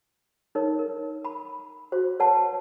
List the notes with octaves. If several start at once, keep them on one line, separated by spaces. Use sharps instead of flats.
D#4 A#4 C#5
A#4
B5
F#4 C5
B4 C#5 F#5 A5